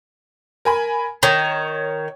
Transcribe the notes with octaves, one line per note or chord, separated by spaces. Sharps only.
A#4 G#5 B5
D#3 C#5